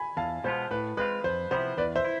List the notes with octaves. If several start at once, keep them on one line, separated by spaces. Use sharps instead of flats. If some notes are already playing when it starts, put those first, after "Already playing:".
Already playing: G#5 B5
E2 F5 A5
B2 G#3 B3 F4 C5
A2 B4
G#3 C4 F4 B4
F2 C5
C3 F3 B3 E4 C5
E2 B4 D5
C5 E5
E4